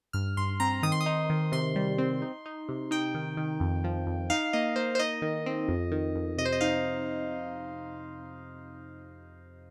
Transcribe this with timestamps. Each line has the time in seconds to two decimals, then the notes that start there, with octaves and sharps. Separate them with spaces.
0.13 G2 F6
0.37 G2 C6
0.60 C4 A#5
0.83 D#3 D#6
0.92 C6
1.01 D#6
1.06 D#4
1.30 D#3
1.52 C3 C6
1.76 G3
1.98 C4
2.22 D#4
2.46 D#4
2.69 C3
2.91 D#4 G5
3.14 D#3
3.37 D#3
3.60 F2
3.84 F3
4.07 F2
4.30 D#4 F5
4.53 A#3 D#5
4.76 A#3 C5
4.95 C5
4.99 D#4 D#5
5.22 D#3
5.46 C4
5.68 F2
5.92 D#3
6.15 F2
6.38 C3 D#5
6.45 C5
6.52 D#5
6.61 D#4 F5